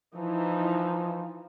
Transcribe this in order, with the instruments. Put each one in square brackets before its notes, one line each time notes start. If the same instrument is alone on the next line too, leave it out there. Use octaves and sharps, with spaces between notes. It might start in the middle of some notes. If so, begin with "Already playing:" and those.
[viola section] E3 D#4 [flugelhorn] F3